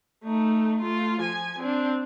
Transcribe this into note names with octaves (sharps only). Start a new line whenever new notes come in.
A3 D#4
A3 F4
F3 G#5
C4 D4